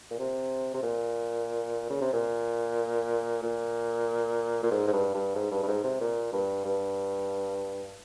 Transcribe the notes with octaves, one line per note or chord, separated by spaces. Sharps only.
A#2
C3
C3
A#2
C#3
C3
A#2
A#2
A#2
G#2
G#2
G2
G2
G#2
G2
G2
G#2
C3
A#2
G2
G2